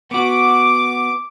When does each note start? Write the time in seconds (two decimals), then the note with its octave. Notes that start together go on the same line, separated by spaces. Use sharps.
0.11 B3 F#4 D6